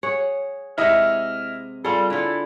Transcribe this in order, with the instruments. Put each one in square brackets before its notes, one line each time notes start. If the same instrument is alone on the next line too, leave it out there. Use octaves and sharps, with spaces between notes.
[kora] G#4 C#5 F#5
[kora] C3 G#3 F#5 [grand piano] E4 D#5 E5 [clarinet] F6
[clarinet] G3 [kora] F4 G#4 [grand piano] A4
[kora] D3 F4 [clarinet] E4